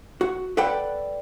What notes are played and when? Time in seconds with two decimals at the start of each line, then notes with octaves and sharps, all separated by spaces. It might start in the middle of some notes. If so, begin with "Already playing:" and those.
0.21 F#4
0.57 A4 B4 D5 F#5 G5 B5